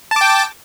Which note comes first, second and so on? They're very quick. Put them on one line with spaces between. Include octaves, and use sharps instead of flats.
A5 D6 G5